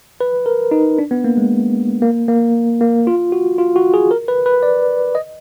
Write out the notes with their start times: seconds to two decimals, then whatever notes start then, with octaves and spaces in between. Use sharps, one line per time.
0.21 B4
0.46 A#4
0.71 D#4
0.99 D4
1.11 B3
1.24 A#3
1.37 G#3
2.02 A#3
2.28 A#3
2.81 A#3
3.07 F4
3.32 F#4
3.58 F4
3.76 F#4
3.94 G#4
4.11 A#4
4.28 B4
4.46 B4
4.63 D5
5.15 D#5